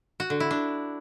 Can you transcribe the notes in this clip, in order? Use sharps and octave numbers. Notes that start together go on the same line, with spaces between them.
F#4
D3
E4
D4